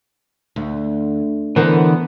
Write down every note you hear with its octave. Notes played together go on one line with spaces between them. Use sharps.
D2
D3 E3 B3 A#4 C5